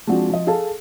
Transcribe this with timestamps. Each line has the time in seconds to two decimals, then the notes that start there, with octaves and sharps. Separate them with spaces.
0.07 F3 G#3 C4 D4 F#4
0.30 F3 D#5
0.47 G#4 A4 F5 A5